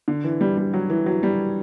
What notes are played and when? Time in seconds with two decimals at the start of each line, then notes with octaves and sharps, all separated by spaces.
0.08 D3
0.24 E3
0.41 G3
0.57 G3
0.74 F#3
0.90 E3
1.06 F#3
1.23 G3